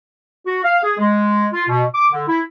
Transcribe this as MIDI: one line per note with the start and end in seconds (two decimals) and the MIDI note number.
0.46 0.60 66
0.64 0.81 77
0.83 0.94 68
0.99 1.47 56
1.53 1.64 65
1.69 1.85 47
1.94 2.06 86
2.12 2.24 50
2.28 2.41 64